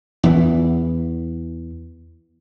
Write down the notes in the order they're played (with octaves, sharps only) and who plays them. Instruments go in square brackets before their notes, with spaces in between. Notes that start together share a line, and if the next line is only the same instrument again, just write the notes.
[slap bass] E2 E3